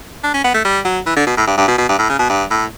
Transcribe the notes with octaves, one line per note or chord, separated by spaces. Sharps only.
D4
C#4
B3
A3
G3
F#3
E3
D3
B2
A2
G2
G2
B2
B2
G2
A2
C#3
B2
G2
A2